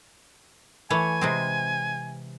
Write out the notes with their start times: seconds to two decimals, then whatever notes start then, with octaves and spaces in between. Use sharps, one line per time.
0.90 E3 A3 C#5 G#5
1.21 C3 G#3 C4